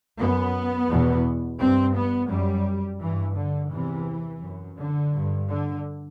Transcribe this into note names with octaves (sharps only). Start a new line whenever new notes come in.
F#2 B3
E2 B2
G2 C4
B3
F#2 G3
G2 E3
D3
E2 C3 E3
F#2
D3
G2
D3